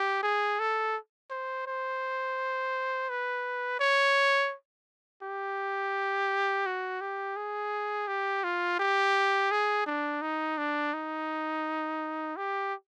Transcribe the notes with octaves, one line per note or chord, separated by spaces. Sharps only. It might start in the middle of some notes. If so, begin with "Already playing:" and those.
Already playing: G4
G#4
A4
C5
C5
B4
C#5
G4
F#4
G4
G#4
G4
F4
G4
G#4
D4
D#4
D4
D#4
G4